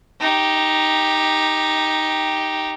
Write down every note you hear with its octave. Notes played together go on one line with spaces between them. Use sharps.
D#4 G4